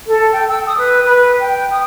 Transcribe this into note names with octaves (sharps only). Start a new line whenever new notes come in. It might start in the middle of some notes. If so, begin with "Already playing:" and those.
A4
G5
E6
D#6
B4
B4
G5
D#6